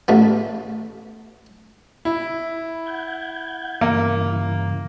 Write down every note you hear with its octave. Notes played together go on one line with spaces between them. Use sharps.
A1 A3 B3
E4
F#5 G6 G#6
G2 C#3 E3 A#3